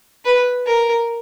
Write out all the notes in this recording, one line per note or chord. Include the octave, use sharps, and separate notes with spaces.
B4
A#4